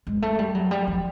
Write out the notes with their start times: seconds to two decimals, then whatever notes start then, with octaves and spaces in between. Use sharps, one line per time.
0.07 G#3
0.22 A3
0.39 G3
0.55 F#3
0.71 G3
0.87 F3